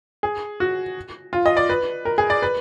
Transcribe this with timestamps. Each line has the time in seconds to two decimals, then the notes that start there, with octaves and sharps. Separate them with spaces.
0.23 G#4
0.60 F#4
1.33 F4
1.46 D#5
1.57 D5
1.69 B4
2.05 A#4
2.18 G#4
2.30 D5
2.42 B4